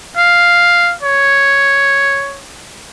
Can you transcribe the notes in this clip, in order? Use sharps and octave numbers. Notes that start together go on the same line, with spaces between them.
F5
C#5